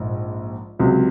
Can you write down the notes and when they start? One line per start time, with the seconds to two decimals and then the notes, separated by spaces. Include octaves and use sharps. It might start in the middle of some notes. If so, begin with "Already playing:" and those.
Already playing: A#1 G#2
0.79 C#2 C3 F#3